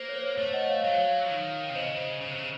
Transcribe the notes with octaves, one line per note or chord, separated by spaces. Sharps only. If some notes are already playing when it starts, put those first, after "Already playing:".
Already playing: A#3 C5
C#5
C5
C5
A3 C#5
D#5 F#5
C#5 F5
F#3 C#5 F5
F3
D#3
C3
C#3 C5 D#5
C#3
C3
C#3